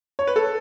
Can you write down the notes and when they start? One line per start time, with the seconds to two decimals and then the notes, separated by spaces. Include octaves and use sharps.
0.19 C#5
0.27 B4
0.36 A4